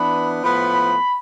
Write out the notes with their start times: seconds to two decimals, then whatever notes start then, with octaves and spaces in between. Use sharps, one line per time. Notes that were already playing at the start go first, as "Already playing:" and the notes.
Already playing: E3 B3 D4 B5
0.42 A2 F3 B3 B5